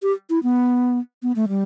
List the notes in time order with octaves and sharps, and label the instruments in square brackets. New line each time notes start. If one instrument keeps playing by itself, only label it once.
[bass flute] G4
E4
B3
B3
A3
G3